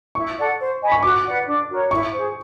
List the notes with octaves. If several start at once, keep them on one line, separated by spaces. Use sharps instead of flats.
E4 C#6
A4 D5 F#5
C5
D#5 G#5 B5
C#6
F#4 D6
B4 D5 F#5
D4
F#4 A#4 C#5
E4 C#6
G#4 C5